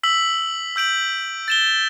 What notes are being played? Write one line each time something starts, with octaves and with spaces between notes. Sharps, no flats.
E6 B6 F#7
E6 G6 D7 F#7
A6 E7 G7